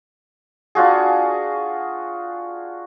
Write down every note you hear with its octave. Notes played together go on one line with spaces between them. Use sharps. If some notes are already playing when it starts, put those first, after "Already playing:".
D4 F4 F#4 G#4